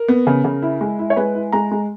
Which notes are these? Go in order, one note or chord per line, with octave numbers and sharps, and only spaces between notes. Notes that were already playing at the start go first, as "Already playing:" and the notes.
Already playing: A#4
B3
C#3
C#3
E4
G#3
E4
C#5
G#3 B4
E4
G#3 A#5
G#3